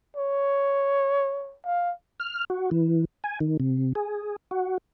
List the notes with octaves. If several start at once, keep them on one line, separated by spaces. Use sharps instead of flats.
C#5
F5
F6
F#4
E3
G#5
D#3
C3
G#4
F#4